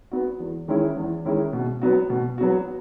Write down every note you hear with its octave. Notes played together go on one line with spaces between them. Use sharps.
B3 F#4
E2
D#3 G#3 C#4 E4
E2
D#3 G#3 C#4 E4
B2
F#3 B3 F#4
B2
F#3 B3 F#4